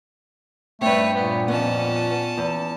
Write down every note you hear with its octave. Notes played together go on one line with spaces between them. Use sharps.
G2 A3 C4 B4 C#5
A#2 B3
F2 B3 C#4 A5
E2